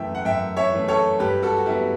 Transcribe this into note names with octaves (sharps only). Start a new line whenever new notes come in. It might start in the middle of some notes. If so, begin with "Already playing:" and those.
Already playing: F#2 E3 A3 E5 G5
F#5
F#2 E5 G5
C#5 E5
E3 A3
A4 C#5
G2 G4 B4
F#4 A4
F#4
F#3 B3 E4 G4